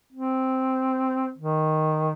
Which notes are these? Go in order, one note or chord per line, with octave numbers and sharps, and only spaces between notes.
C4
D#3